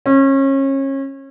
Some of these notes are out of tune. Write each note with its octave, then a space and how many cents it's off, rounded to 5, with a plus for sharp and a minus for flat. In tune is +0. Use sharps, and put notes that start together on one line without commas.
C#4 -30